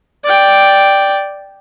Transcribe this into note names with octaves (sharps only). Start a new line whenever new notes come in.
D5 G5